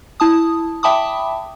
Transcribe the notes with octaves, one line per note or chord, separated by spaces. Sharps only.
E4 A5 D#6
E5 G5 A5 B5 D6 D#6